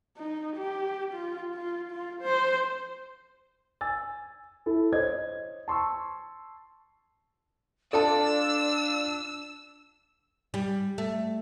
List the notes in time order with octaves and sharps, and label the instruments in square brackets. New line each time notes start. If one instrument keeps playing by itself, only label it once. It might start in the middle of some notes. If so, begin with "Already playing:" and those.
[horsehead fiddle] D#4
G4
F4
F4
F4
C5
[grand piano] G#5 E6 A6
E4 A4
C5 C#5 D#5 G#6
A5 C6 C#6 E6
[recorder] D4 [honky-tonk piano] F4 D5 [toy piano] A4 G5 A5 [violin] E6
[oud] G3
A3